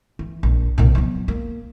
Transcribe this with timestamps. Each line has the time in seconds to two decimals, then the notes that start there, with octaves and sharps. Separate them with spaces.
0.19 E3
0.43 A#1
0.78 C2 A#2
0.95 F#3 B3
1.28 A#3